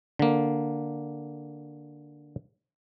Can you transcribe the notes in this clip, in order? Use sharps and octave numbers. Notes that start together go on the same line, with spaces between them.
D3 A#3